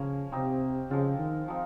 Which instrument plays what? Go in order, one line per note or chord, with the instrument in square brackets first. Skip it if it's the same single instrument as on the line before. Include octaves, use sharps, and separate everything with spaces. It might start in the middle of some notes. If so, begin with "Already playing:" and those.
Already playing: [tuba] C#3 [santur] F3 A#3 C#4
[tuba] C3 [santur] C4 D#4 G4
[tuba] C#3 [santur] F3 G#3 C4 F4
[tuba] D#3
[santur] F3 C4 D#4